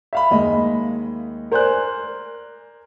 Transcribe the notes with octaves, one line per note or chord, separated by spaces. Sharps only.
E5 F5 B5
D#2 G#3 D#5
A#4 C5 D5 G#5 F#6